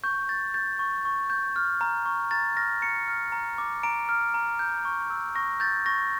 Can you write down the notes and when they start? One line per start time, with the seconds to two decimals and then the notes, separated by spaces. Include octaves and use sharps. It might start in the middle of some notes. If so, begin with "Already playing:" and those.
0.04 C#6 G6
0.29 G6 A6
0.54 G6 A6
0.79 C#6
1.05 C#6
1.30 G6
1.56 F6
1.81 A#5
2.06 C#6
2.31 A#5 A6
2.57 F6 A#6
2.82 A#5 C#7
3.08 F6
3.32 A#5
3.58 D6
3.83 A#5 D7
4.09 F6
4.34 A#5
4.59 G6
4.85 C#6
5.10 E6
5.36 C#6 A#6
5.60 G6 A6
5.86 C#6 A#6